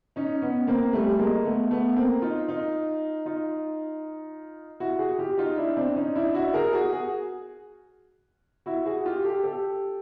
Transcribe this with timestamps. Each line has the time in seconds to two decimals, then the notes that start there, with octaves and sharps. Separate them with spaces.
0.16 C#4 D#4
0.42 B3 C#4
0.67 A#3 C4
0.93 G3 A3
1.19 G#3 A#3
1.45 A3 B3
1.71 A3 B3
1.96 A#3 C4
2.22 D#4 F4
2.48 D#4 F4
3.26 D#4 F4
4.80 E4 F#4
4.99 F#4 G#4
5.19 F4 G4
5.37 D#4 F4
5.57 D4 E4
5.77 C4 D4
5.96 C#4 D#4
6.15 D4 E4
6.34 E4 F#4
6.54 G#4 A#4
6.73 F#4 G#4
6.92 F#4 G#4
8.66 E4 F#4
8.86 F#4 G#4
9.05 F4 G4
9.24 G4 A4
9.43 G4 A4